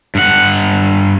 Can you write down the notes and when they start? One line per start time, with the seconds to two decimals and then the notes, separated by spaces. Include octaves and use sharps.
0.15 G2 F#5